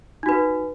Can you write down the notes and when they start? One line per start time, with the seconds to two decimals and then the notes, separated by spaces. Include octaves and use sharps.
0.23 D#4
0.26 F#4
0.29 B4